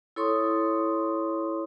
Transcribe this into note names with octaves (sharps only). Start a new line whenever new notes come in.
E4 A4 C#5 C6 C#6 D#6